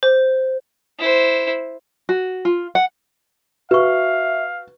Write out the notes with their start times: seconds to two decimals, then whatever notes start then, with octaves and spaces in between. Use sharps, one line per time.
0.03 C5
0.99 E4 C5
2.09 F#4
2.45 F4
2.75 F#5
3.71 F#4 B4 E5 F5 C#6